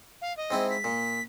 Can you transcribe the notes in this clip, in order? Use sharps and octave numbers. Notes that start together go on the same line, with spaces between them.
F5
D#5
G#2 C4 E4
B6
A#2